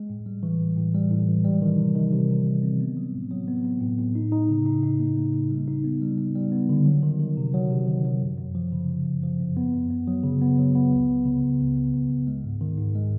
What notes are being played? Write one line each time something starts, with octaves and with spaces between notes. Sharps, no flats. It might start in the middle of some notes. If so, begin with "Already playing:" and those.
Already playing: G#3
A2
G3
E3
A2
A2
G3
A2
E3
G3
D#3
C3
D#3
C3
C3
D#3
C4
B3
F#3
A2
F#3
B3
B3
A2
A2
D#4
D#4
C#3
D#4
D#4
A#3
A#3
C#3
G3
D#4
B3
G3
G3
G3
B3
D3
F#3
D#3
D#3
C3
F#3
C3
D#3
F#3
F#2
F#2
F3
C#3
C#3
F#2
F3
F#2
B3
F#2
B3
F#3
C#3
B3
F#3
B3
C#2
C#2
C#3
C#2
C#2
C#3
C#2
C#2
G#3
G#2
D#3
G#2
G#3